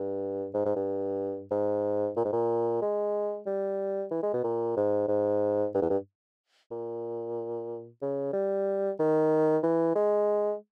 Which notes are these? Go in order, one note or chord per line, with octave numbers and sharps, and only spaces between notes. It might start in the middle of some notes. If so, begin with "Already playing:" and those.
Already playing: G2
G#2
G#2
G2
G#2
A#2
G#2
A#2
G#3
G3
E3
G#3
B2
A#2
G#2
G#2
G2
E2
G2
A#2
C#3
G3
D#3
E3
G#3